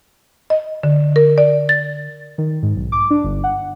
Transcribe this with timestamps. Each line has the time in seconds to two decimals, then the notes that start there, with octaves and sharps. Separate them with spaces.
0.50 D#5
0.83 D3
1.16 A#4
1.38 D5
1.69 A6
2.38 D#3
2.63 G#2
2.76 B1
2.92 D6
3.10 D4
3.24 G1
3.44 F#5